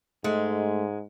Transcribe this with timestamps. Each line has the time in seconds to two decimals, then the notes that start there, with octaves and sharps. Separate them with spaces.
0.24 G#2 G#3 A3